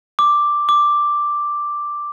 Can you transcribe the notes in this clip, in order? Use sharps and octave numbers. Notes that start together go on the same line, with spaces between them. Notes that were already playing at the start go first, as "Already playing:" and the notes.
D6
D6